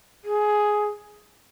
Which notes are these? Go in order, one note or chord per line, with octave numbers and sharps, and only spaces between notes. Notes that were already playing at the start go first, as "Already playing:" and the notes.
G#4